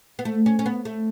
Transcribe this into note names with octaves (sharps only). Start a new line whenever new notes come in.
B3
A3
C#4
C#4
B3
A3